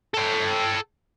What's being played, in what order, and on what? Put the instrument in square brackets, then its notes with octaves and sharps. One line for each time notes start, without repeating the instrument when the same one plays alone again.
[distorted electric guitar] A4 G5